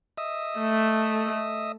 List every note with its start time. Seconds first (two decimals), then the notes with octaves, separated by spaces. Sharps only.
0.18 D#5 E5
0.58 A3